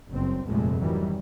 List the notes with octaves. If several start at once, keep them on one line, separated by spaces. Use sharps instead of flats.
F#1 G2 C4
F1 A#1 G2 C3 G#3 A3
G#2 D#3 E3 F#3 G3